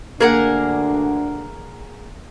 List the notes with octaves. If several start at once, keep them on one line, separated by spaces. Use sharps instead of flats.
D2 D3 A#3 D4 G#4 A#4 F#5